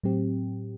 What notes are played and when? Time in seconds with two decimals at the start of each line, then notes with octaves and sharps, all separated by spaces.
0.03 A2 F#3 C4 G4